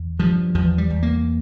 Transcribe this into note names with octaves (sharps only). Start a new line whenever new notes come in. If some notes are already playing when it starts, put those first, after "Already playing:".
Already playing: E2
G2 F3
E2 F3
G3
E2
A#3